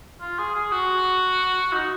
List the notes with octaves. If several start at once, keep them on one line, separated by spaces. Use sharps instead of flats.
F4
G#4
G#4
F#4
D#4